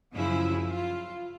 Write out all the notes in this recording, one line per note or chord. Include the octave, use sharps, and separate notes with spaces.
F#2 C#3 F3 E4
F4